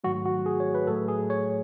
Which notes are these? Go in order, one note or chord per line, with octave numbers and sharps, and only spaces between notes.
G#2 D#3 F#3 A3 F#4
F#4
G#4
C#5
B4
A2 F#3 A3 A4
G#4
C#5